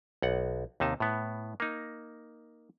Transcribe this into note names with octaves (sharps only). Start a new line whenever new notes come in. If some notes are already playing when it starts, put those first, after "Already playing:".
B1 F#5
D#2 C3 D#4 A5
A2 B3
A#3 D#4